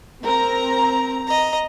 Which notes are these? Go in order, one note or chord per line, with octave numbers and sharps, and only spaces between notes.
C4 A#4 A#5
D#5 A#5